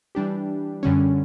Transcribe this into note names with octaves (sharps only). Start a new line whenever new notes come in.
E3 G3 D4 G4
F#2 D3 G3 C#4